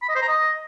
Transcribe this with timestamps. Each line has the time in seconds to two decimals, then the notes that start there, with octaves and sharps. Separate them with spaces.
0.02 B5
0.09 D#5
0.15 C5
0.22 A#5
0.28 D#5